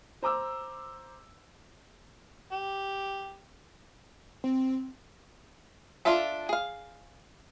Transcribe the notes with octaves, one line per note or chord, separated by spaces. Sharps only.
C5 A#5 D6 E6
G4
C4
D4 F4 A4 E5 A5
G#4 F5